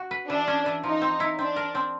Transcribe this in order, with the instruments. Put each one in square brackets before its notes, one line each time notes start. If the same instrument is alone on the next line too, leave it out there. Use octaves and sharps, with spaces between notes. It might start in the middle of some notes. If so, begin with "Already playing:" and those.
Already playing: [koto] F#4
B4
[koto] E3 [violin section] D4
[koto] C#4
E3
[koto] F3 [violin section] D#4
[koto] C4
E4
[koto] C4 [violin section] D4
[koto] A#4
C4